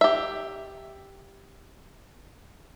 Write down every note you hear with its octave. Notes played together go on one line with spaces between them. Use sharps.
G4 E5